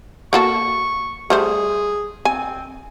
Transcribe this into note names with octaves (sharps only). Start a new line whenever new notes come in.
A#3 F#4 A4 C#6
G3 A3 G#4 C5
C4 G#5